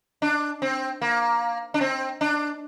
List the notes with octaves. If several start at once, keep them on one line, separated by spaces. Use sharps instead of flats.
D4
C4
A#3
D4
C4
D4